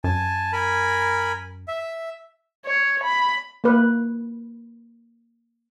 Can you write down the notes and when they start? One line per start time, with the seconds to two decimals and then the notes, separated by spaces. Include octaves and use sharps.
0.04 F#2 G#5 A5
0.53 A#4 G#5 B5
1.68 E5
2.66 C#5
3.04 B5
3.64 A#3 B4